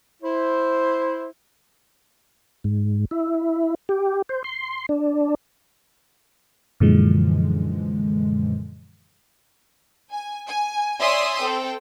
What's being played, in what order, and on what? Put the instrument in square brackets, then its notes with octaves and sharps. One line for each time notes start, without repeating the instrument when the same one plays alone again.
[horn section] E4 C5
[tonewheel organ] G#2
E4
G4
C5
C6
D4
[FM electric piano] F#2 A#2 D3 E3 F3 G#3
[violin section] G#5
G#5
C#5 D5 E5 G#5 C6 D#6
C4 A4 G5